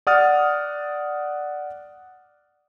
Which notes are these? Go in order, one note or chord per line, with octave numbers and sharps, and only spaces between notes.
D5 F#5 D#6 F6 A6